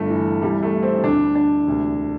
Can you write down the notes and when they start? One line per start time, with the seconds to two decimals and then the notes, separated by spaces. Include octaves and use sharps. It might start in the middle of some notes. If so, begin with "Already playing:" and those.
Already playing: G1 G2 D3 A3
0.10 E3
0.42 C2 C3 E3 G3
0.63 A3
0.83 C4
1.03 D2 D3 D4
1.35 D4
1.66 E1 D2 C3